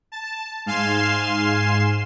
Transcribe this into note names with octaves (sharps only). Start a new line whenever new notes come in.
A5
G#2 F5 G#5 C6 C7 E7